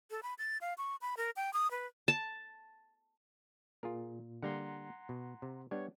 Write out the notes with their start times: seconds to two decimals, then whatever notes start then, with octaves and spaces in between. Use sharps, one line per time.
0.10 A4
0.23 B5
0.38 A6
0.61 F5
0.78 C#6
1.01 B5
1.17 A#4
1.36 G5
1.53 D#6
1.71 B4
2.08 A5
3.83 A#2 F4 G#4 A#4
4.43 D3 G3 A#3 F#5 A#5 C6
5.09 B2
5.42 C3
5.71 G3 B3 D4 C#5